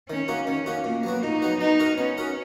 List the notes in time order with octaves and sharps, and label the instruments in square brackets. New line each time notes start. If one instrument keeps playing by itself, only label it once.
[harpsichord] D#3 [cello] C#4
[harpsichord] A#3 D#4 F#4
[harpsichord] D#3 [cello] C#4
[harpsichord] A#3 D#4 F#4
[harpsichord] A#2 [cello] A#3
[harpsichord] F#3 B3 F#4
[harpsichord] A#2 [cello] D#4
[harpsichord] F#3 B3 F#4
[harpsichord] B3 [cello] D#4
[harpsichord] F#4 A#4 D#5
[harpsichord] B3 [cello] C#4
[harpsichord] F#4 A#4 D#5